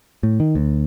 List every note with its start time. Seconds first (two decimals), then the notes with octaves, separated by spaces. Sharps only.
0.23 A2
0.40 D#3
0.55 D2